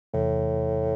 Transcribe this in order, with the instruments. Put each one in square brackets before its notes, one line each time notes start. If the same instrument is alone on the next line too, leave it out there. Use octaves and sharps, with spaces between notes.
[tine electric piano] E2 C3 E3 A3 [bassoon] A2